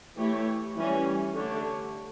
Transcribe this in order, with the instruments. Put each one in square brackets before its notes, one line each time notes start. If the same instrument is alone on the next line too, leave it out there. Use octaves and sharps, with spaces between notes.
[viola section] E3 A3 E4 G4 C#5
E3 G3 C#4
D3 A3 D4 G4 C#5